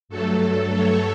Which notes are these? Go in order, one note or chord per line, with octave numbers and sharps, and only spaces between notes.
G2 F#3 A3 A4
C#5